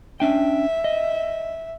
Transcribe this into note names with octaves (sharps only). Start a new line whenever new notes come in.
C#4 D4 E5 G5
D#5